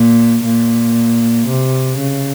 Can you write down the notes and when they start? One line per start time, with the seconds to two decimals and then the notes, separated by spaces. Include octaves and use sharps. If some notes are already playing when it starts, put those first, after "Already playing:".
Already playing: A#2
0.44 A#2
1.47 C3
1.98 C#3